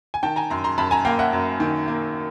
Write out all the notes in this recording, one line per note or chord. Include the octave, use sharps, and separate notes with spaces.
G#5
D#3 G5 A5
G#5 A#5
F#2 A#5 C6
A#5 C6
F#2 A5 B5
G#5 A#5
A#3 F5 G5
E5 F#5
F#2
D#3
A#3